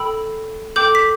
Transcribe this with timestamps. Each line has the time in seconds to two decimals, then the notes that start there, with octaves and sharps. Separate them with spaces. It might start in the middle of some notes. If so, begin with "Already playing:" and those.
Already playing: A4 G5 B5 E6
0.76 A4 G5 D6 G6
0.95 B6